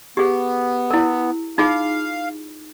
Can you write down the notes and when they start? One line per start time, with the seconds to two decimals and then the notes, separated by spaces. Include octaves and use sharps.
0.17 B3 G4 G#4
0.91 E4 A#4
1.58 D#4 F4 G#4 F5